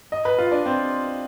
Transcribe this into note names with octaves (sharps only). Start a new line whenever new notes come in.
D#5
B4
F4
D4
C4